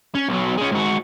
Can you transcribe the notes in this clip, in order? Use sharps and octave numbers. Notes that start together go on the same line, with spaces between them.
C#4
B1 F#3
G#3 C#4
G#2 F#4